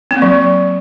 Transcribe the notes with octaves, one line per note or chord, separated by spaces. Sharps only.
C4
A#3
F#3